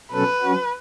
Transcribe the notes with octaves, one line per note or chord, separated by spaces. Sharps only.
B2 F#3 C#4 A4 B4
F#3 C#4 F#4